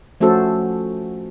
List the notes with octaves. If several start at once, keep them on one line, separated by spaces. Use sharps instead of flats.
F3 A3 C#4 F#4 A4 C5